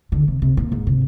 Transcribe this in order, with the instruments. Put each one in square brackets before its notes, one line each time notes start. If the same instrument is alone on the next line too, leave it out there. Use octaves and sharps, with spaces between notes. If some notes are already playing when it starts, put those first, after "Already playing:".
[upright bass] D3
C3
C3
A#2
G#2
C3